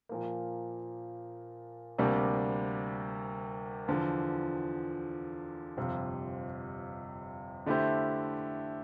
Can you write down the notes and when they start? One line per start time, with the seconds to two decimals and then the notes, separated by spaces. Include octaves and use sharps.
0.09 A#2 F3 A#3
1.99 D2 C3 G3 A#3 D4
3.88 E2 D3 F3
5.77 G1 F2 C3
7.66 D3 A3 E4 G4 C5